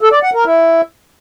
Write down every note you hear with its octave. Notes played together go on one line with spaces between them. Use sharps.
A4
D5
F#5
A#4
E4